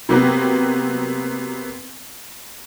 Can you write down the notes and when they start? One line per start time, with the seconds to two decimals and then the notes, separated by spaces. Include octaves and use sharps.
0.09 C3 F#3 A#3 B3